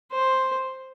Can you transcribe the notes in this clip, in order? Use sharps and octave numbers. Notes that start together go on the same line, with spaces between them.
C5